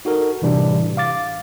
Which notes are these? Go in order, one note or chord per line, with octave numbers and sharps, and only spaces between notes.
D#4 F#4 A4 A#4
A2 C3 E3 G3 D4
F5 D6 A6